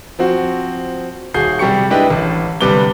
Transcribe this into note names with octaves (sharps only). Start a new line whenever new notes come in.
F3 C4 F#4
D#1 F#4 G#4 G6 C7
C3 G3 G4 C#6 C#7
G#3 D4 E4 G4 B4 D#5
A1
G1 C3 G3 B4 D6 G7